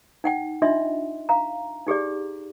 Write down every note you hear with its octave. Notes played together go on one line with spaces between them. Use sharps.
D#4 F#5 G5
D4 D#4 F4 D#5 E5 C6
F5 A#5
D#4 G4 G#4 D5